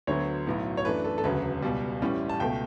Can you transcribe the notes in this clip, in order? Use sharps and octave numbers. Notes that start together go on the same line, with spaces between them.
D2 D3 F#3 B3 C#5
B1 A2 F#3 B3
C#5
F#2 E3 A3 D4 B4
A4
A4
E1 D2 C#3 F#3 B4
C#2 B2 G3
A1 A2 G3 C#4 E4
A5
C#2 B2 A3 G5